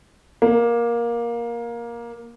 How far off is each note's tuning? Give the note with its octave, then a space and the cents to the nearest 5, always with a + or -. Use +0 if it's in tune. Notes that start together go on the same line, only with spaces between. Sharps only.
A#3 +15